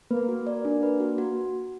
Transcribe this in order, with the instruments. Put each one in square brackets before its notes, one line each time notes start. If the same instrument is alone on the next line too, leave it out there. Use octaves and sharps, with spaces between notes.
[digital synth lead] A#3 [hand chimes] B4
[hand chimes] F#4
D5
D4
B4
F#4
F#4